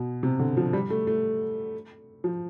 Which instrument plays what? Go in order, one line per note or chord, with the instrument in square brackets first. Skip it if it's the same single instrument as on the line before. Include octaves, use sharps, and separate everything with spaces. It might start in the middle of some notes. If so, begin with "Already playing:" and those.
Already playing: [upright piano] B2
C3
D3
F3
G3
A3
A3
F3